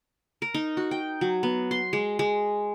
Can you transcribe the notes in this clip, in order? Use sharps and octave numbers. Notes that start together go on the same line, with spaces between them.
A#4
D#4
F#4
G5
F#3
B3
C6
G#3
G#3